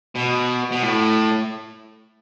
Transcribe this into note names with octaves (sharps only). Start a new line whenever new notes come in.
B2
B2
A2